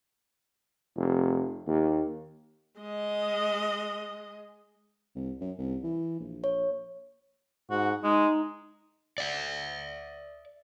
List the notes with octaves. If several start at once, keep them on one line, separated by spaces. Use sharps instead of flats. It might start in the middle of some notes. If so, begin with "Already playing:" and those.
F1
D#2
G#3 D#5
C2
F#2
C2
E3
A#1
C#5
G#2 F#4
G#3 D#4
D5 E5